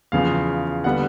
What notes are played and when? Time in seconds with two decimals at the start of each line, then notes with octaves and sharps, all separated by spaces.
0.12 E2 C#3 F3 F5
0.84 D3 G3 B3 F#5